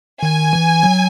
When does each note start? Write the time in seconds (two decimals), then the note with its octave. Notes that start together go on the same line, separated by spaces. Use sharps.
0.23 D#3 G#5
0.53 E3
0.83 F#3